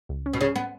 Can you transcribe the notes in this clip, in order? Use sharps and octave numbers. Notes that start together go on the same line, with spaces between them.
C#2
C#4
B2
C#3 C#4
B3